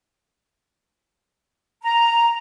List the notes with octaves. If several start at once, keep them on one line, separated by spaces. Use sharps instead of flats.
A#5